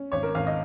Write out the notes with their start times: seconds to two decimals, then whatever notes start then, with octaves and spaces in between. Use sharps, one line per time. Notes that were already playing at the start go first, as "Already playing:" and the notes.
Already playing: C#4
0.12 G#1 C#5
0.23 A#4
0.35 G#1 F5
0.47 D#5